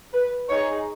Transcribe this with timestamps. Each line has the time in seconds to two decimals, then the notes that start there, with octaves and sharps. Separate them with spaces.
0.13 B4
0.49 D#4 G#4 C#5